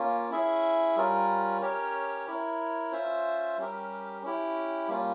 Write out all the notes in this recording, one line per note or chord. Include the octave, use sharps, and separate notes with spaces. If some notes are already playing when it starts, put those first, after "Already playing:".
Already playing: A#3 C#4 F4
C#4 E4 G#4 E5
G3 C#4 F4 A#4
C#4 G4 A#4 C#5
E4 A#4 C#5
C#4 F4 C5 E5
G3 C#4 G4 A#4
C#4 E4 G4
G3 A#3 C#4 F4